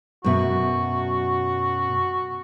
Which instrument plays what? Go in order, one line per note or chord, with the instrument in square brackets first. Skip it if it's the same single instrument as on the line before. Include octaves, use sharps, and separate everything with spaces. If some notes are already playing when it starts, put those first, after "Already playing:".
[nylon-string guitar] F#2 B2 E5 [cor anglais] F#4